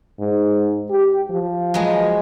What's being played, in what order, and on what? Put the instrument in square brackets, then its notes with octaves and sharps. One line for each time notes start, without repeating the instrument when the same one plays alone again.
[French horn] G#2
G4
F3
[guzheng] F#3 G#3 B3